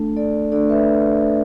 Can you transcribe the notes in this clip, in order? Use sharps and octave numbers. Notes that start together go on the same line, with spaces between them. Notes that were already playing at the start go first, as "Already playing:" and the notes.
Already playing: A3 D4 A4
A4 D5
A3 D4 A4 D5
B4 E5